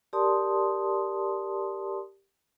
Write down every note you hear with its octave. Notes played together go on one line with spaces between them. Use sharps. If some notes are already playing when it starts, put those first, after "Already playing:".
G4 A#4 D5 A5 C6 D#6